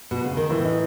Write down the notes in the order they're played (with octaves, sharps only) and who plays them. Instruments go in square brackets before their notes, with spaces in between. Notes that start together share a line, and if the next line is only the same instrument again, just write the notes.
[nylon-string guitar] B2
C#3
D#3
[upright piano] A2 [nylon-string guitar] E3
[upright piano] D#4